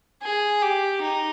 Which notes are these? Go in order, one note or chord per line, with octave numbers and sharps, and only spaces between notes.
G#4
G4
D#4